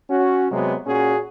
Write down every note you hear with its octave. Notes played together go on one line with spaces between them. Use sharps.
C#4 F#4
C3 F#3 G#3 B3
A#2 C#4 F#4 G#4